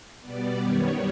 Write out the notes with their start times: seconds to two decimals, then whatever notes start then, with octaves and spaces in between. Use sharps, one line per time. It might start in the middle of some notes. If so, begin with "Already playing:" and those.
0.22 B2 G3 B3 D5
0.59 F#2 D#3 G3 B3 C#5